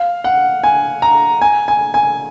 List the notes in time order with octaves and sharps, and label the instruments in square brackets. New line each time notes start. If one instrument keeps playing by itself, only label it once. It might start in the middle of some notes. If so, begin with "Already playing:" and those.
Already playing: [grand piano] F5
F#5
G#5
A#5
G#5
G#5
G#5